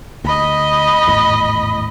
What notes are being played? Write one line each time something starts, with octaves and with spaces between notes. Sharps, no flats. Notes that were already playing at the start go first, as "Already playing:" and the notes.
D2 D#5 B5
G#1 E2 A2